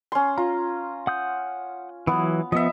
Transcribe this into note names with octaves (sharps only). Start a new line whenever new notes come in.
C#4 C6
F4 A#5
F#5 D#6 G6
E3 F#3 B3
F3 B3 D#5 E5